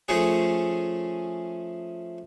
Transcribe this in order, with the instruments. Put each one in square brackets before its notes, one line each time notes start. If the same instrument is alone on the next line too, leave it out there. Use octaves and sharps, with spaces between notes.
[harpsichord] F3 A3 C#4 G#4